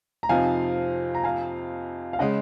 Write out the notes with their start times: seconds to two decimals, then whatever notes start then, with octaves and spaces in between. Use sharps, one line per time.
0.23 A#5
0.29 F2 C3 F3 C4 D#4 F5 G#5
1.15 A#5
1.24 F5 G#5
2.13 F5
2.19 C#3 G#3 D#5 F#5